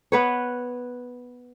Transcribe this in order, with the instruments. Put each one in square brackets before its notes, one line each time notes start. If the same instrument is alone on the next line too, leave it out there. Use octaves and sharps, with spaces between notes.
[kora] B3 B4 C#5